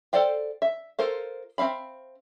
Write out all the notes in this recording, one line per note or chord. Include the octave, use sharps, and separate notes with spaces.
A4 C5 D5 F5 G5
E5
F4 A4 A#4 C5 F5
C4 E5 F5 B5